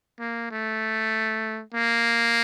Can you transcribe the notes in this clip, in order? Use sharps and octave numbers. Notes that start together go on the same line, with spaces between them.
A#3
A3
A#3